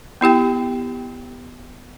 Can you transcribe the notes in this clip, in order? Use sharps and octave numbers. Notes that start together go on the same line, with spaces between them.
B3 E4 G4 G5